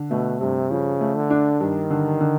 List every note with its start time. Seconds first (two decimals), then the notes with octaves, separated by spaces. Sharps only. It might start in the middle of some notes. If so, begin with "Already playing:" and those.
Already playing: D3
0.11 B2 A3
0.41 G2 C3
0.70 C#3 F3
1.01 A3
1.15 D3
1.30 D4
1.60 G2 D#3
1.90 D3
2.20 D3